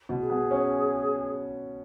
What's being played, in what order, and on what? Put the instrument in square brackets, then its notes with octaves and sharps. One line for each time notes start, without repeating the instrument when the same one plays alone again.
[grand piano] B2
[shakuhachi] G#4
[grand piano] B3
C#4